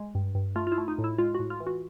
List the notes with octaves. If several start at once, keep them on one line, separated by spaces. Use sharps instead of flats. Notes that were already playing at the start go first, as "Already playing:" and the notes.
Already playing: G#3
G2
G2
A3 F4
F4
E4
A3
D#4
A2
E4
G#3 F4
F#4
A2
F4
E3
F#4